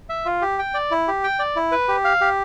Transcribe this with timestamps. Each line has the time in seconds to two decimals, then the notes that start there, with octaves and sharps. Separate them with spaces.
0.09 E5
0.25 F4
0.42 G4
0.59 G5
0.74 D5
0.91 E4
1.08 G4
1.24 G5
1.39 D5
1.56 E4
1.72 B4
1.88 G4
2.04 F5
2.21 G4